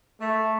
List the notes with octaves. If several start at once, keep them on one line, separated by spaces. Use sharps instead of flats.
A3